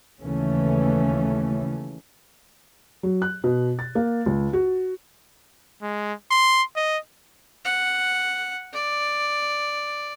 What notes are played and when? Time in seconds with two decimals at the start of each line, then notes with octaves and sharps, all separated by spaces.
0.21 D#2 C#3 E3 A3 C#4
3.03 F#3
3.22 F#6
3.44 B2
3.79 A6
3.95 A#3
4.26 C#2
4.53 F#4
5.82 G#3
6.31 C6
6.76 D#5
7.65 F#5
8.73 D5